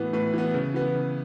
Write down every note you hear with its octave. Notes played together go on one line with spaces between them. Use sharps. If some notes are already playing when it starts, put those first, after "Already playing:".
Already playing: A2 E3 B3
A2 B4
E3 B3
C#3
E3 B3
C#3